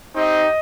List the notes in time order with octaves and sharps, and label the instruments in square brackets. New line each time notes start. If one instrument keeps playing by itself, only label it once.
[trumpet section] C4 D#4 G4 D#5